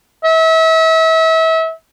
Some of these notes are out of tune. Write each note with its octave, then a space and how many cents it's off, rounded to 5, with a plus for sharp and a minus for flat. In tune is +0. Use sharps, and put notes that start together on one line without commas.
E5 -35